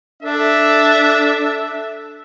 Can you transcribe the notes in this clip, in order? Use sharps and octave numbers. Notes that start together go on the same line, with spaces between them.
D4 A4 E5